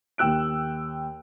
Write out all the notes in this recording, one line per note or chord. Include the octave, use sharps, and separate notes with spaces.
D#2 G5 E6 F#6 D7